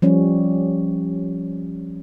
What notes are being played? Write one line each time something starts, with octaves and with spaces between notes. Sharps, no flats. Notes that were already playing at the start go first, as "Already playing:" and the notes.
F3 G3 C#4